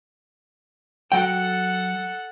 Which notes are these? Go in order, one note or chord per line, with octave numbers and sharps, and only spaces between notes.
F#3 A4 F#5 G5